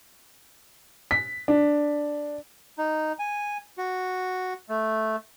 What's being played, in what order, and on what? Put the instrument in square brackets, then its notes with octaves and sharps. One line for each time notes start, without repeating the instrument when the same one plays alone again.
[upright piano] B6
D4
[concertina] D#4
G#5
F#4
A3